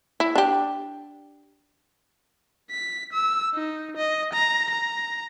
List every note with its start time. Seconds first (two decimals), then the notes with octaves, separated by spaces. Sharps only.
0.20 E4
0.35 D4 G4
2.71 B6
3.13 E6
3.55 D#4
3.97 D#5
4.33 A#5
4.70 A#5